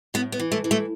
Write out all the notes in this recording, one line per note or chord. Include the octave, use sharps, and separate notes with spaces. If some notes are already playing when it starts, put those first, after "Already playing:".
A2 B3
B3
E3
A3
E3
A3